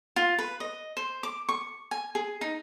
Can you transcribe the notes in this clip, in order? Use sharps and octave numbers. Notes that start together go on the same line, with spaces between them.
F4
B4
D#5
C5
D6
C#6
G#5
G#4
D#4